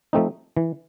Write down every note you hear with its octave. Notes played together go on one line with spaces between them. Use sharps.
F3 A3 C4 D#4
E3